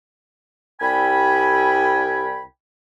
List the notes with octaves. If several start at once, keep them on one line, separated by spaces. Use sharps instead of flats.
C2 G5 G#5 B5